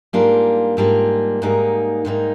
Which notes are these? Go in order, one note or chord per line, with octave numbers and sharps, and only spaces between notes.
G#2 G3 A#3 D4 F4
G#2 G3 A#3 D4 F4
G#2 G3 A#3 D#4
G#2 G3 A#3 D#4